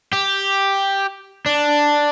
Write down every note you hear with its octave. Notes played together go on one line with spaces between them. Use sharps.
G4
D4